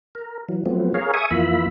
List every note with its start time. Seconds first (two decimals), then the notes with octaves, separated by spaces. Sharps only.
0.15 A#4
0.49 E3 F#3
0.66 F3 F#3 A3 B3 C4
0.94 G#4 A#4 C#5 F5
1.14 E5 G#5 C#6 D#6
1.31 F2 E3 A#3 F4 E5 B5